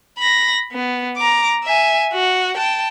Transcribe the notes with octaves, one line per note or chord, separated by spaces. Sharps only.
B5 A#6
B3
A#5 D6
E5 G#5
F#4
G5 A5